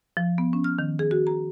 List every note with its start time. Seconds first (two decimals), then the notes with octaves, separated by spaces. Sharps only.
0.17 F3
0.38 B3
0.53 C#4
0.64 F6
0.79 D#3
0.99 G#4
1.11 F#4
1.27 A#5